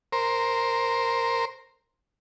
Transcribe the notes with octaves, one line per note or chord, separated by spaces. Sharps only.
A#4 C5